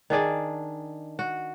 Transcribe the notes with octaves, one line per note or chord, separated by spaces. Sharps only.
D#3 D4 G#4 D5
F#4